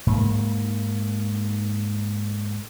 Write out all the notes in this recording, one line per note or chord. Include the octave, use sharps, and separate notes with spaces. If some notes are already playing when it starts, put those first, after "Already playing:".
G#2 A#3